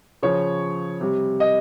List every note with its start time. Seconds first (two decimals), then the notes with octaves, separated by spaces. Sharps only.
0.23 C#3 F3 C#5
1.01 C3 G3
1.40 D#5